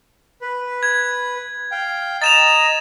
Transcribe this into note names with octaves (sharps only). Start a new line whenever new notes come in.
B4
G#6
F5 G5
D#5 A#5 A6 E7 F7